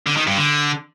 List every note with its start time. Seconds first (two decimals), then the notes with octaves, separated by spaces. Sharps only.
0.06 D3
0.17 D#3
0.27 G2
0.37 D3